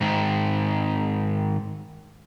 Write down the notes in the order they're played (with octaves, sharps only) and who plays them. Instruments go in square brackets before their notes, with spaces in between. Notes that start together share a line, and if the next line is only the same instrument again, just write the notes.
[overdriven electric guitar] G#2 D#3